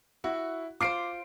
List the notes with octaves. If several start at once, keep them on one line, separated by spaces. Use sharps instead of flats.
E4 F#4
F4 C5 D6 C7 D7